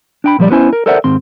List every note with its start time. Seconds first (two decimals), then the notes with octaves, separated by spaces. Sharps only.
0.24 D4 G5 B5
0.39 A#2 F3 G3 D5
0.51 B3 C#4 E4 C5 G#5
0.73 A#4
0.86 A4 A#4 C5 D5 E5 F#5
1.04 D#2 G#2 C4 C6